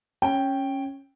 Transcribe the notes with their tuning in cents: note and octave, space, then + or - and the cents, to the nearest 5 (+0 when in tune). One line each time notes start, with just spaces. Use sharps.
C#4 -10 G5 +0